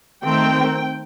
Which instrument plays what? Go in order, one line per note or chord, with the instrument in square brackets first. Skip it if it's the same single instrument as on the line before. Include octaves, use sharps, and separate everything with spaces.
[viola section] D#3 A3 C4 G5